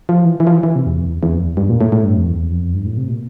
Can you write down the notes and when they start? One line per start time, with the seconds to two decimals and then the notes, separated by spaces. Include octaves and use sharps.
0.09 F3
0.25 E3
0.40 E3
0.47 F3
0.52 E3
0.63 E3
0.76 C3
0.86 E2
0.97 F2
1.07 E2
1.23 E2
1.34 F2
1.46 E2
1.57 G2
1.69 A#2
1.81 A2
1.92 A2
2.04 G2
2.16 F2
2.27 E2
2.50 F2
2.74 G2
2.85 A2
2.97 C3
3.09 A#2